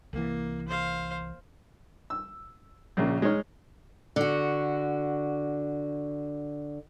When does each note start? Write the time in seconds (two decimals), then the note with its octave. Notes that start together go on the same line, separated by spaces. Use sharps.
0.13 C2 E3 A#3
0.68 C5 F5
2.10 E6
2.97 A#1 C#3 A#3
3.22 G#3 D#4 C#5 F6
4.16 D3 F#4